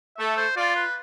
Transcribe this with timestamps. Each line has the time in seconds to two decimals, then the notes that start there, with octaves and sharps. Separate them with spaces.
0.17 A3 A4 E5
0.37 C5
0.56 F4 D5
0.76 B4